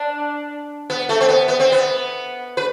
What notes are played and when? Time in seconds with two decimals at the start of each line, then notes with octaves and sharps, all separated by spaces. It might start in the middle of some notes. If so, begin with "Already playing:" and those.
Already playing: D4
0.90 B3
1.09 A3
1.21 C4
1.29 B3
1.48 B3
1.60 C4
1.72 B3
2.57 B4